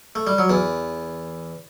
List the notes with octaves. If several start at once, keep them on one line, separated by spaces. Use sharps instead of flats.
A3
G3
F#3
E2 E3